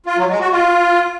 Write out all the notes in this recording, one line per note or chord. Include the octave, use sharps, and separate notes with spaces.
F4
F#3
G#3
F#4
F4